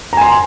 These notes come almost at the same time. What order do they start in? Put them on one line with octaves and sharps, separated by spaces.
A#5 G#5 C6